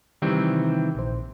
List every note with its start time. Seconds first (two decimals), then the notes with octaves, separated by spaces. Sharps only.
0.22 C3 D#3 E3 G3 C4
0.95 A#1 C5